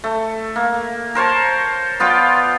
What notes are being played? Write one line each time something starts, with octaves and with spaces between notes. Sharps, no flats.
A3
A#3
A#4 C5 C#5 A5
B3 F4 D5 G5